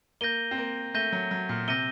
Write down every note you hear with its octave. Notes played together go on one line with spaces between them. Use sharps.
A#3 G6 A#6 D#7 G7
C4
A#3
A3 G6 A#6 D#7 G7
F#3
F#3
A#2
C3 G6 A#6 D#7 G7